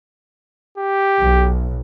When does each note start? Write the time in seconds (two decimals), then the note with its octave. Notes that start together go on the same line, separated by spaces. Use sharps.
0.78 G4
1.20 B1